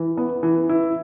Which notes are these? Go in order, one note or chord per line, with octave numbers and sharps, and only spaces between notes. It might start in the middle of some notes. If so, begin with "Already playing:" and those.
Already playing: E3
B3
E3
E4